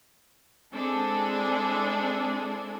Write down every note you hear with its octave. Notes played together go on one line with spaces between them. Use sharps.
G#3 C4 D4 E4 G#4 A4